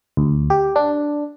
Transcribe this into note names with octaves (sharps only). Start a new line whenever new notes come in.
D2
G4
D4